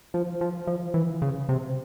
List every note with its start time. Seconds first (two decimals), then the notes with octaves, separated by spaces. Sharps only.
0.14 F3
0.41 F3
0.67 F3
0.94 E3
1.22 C#3
1.49 C3